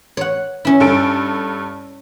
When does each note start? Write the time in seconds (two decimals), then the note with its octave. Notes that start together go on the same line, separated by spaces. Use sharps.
0.17 C#5 F#5
0.65 C#4 E4
0.80 G2 A4 D7